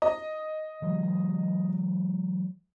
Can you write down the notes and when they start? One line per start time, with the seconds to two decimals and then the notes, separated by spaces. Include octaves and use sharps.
0.02 D#5
0.82 E3 F#3 G#3